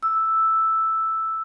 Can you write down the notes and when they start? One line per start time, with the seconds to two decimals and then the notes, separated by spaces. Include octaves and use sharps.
0.03 E6